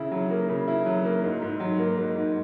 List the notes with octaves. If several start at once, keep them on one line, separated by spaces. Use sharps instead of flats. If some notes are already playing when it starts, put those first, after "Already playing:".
Already playing: C#3 E4
F#3
A#3
C#3
E4
F#3
A#3
G#2
G#2
F#3
A#3
G#2
G#2